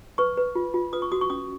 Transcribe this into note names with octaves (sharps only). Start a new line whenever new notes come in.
B4 C#6
B4
F4
F4
B4 D#6
C#6
F#4 D#6
C#6
C#4 D#6